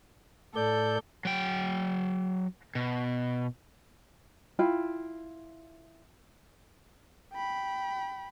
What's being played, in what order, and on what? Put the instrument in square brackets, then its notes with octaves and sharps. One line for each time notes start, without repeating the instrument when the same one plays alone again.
[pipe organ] A2 D5 G6 [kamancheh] A4
[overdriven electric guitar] F#3 G5
B2
[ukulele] E4 F4 G5
[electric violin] G5 B5